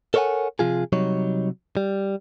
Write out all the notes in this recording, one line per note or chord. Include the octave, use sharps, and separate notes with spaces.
A4 A#4 C#5 D5 F#5 G#5
C3 F3 F4 G#4
C3 F#3 G3 D#4 C#5
G3